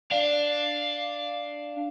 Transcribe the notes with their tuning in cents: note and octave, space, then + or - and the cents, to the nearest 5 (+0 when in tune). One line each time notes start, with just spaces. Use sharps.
D4 +0 F5 +0